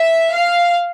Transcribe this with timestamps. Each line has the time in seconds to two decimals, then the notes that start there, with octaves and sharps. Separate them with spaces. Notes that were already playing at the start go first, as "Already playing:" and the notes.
Already playing: E5
0.33 F5